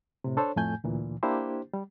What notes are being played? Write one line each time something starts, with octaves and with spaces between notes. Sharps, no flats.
A2 C3
D4 A4 C5 C#5
F2 A2 A3 G#5 G6
D2 A#2 E3
A#3 D4 E4 G4 C5
G3